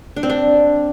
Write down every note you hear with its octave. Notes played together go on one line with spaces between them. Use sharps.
D4
C4
D4